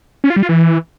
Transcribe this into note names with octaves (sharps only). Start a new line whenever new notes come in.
C#4
F4
G3
F4
E3